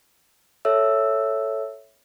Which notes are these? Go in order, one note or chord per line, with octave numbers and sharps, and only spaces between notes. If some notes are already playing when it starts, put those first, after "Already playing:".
A4 C#5 E5 E6